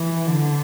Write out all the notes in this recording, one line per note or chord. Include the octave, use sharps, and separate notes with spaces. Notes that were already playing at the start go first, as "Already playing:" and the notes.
Already playing: E3
D3